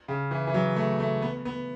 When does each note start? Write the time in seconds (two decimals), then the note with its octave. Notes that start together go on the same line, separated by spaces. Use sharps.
0.08 C#3
0.31 E3
0.47 E3
0.54 F#3
0.76 A3
1.00 A3
1.22 B3
1.45 B3